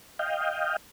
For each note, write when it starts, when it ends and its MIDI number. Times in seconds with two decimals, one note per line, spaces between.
0.19 0.76 75
0.19 0.76 77
0.19 0.76 79